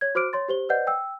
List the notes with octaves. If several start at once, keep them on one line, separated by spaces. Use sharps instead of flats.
C#5 G#6
F#4 C5 D6 F6 D7
C#5 C6 A6
G4 C5 G7
B4 C5 D5 D#5 F#5 G6
G5 E6